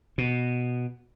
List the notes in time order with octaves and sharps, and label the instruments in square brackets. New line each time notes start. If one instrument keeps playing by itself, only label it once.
[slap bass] B2